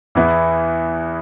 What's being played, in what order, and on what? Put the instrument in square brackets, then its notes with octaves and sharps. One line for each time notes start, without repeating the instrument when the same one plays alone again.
[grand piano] E2 E3 B3 E4